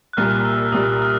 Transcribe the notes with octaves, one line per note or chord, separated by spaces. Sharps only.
F#6
C2 A#2 G3 F6
E6
C2 A#2 G3 D#6
F6
F6